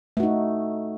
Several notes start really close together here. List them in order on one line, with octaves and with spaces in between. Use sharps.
A3 F#4 D#4